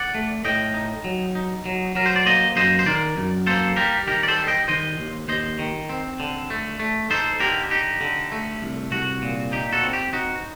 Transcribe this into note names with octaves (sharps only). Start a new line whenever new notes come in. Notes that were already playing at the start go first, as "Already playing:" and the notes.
Already playing: D5 F#5
A3
A2 D#5 G5
D#4
F#3
D#4
F#3
F#3 A#4
C5
D5
A#3 C5 D#5
F#2 C5 D#5
C5
D#3 A#4 D5
F#2
A#3 A4 C5
G3 G4 A#4
D#3 G4 A#4
D5
A4 C5
G3
D#5 G5
D#3 C5 D#5
D#2
D#2 C5 D#5
D#3
C4
D3
A3
A3
D#4 A4 C5
D3 G4 A#4
D#4 G4
D3
A3
C2
C2 F#4
A#2
D#4 G4
F#4 A4
C4
G4
D#4 F#4